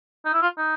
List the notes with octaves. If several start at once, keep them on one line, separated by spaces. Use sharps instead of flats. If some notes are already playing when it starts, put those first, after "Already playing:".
D#4
E4
F4
D#4